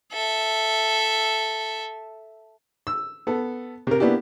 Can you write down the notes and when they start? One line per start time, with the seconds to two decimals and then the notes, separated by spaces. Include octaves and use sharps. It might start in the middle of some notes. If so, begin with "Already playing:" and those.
0.13 A4 E5
2.87 E6
3.27 B3 A4
3.87 C3 A#4
4.00 A#3 B3 D4 E4 G4